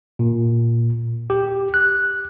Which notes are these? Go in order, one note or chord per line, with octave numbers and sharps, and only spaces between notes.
A#2
G4
F#6